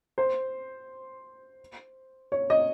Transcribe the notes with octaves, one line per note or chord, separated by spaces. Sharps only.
C5
C#5
D#5